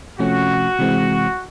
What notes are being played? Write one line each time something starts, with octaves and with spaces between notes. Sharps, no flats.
C3 F3 A3 C#4 F#4
C3 E3 G#3 C4